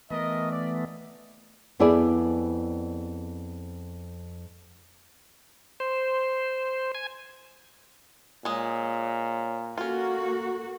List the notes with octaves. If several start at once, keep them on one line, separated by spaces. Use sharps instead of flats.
E3 A3 B3 A#4 D#5
D5
F2 B3 E4 G#4 D5 G#5
C5
G#5
A#2 G#3 C#5 D#5
A#3 C#4 F4 F#4 A4